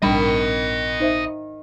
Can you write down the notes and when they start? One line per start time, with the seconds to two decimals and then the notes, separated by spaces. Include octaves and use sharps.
0.02 A#1 G#2 D#3 G3 D4 D#5 B5
1.00 D#4 C5 E5